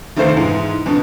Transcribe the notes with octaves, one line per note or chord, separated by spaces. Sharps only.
F1 D#2 A3 C5 F5
G#2 E3
F2 B2 D3